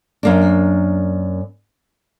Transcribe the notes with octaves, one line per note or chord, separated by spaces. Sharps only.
F#2 A#3 D4